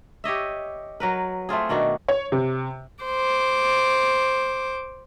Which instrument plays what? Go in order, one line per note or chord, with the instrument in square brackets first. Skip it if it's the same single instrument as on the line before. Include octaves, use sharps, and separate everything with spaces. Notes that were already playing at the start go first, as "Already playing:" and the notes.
[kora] G4 C#5 D#5 E5
F#3 A#4 B4
A3 C4 F4 G#4
B2 D#3 D4 F#4
[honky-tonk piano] C#5
C3
[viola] C5 D6